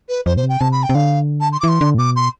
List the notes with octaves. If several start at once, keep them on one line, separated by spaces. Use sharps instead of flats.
B4
F2 C5
B2 C5
C3
G5
C3 A5
B5
G5
C3
D3 F5
A5
C6
D6
E3 C6
D3
A2
B2 D6
C6